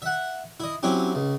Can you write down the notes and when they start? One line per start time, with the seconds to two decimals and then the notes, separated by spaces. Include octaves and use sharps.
0.02 E5 F#5
0.60 E4 D#5
0.83 F#3 C4 C#4 E4 G4
1.15 C#2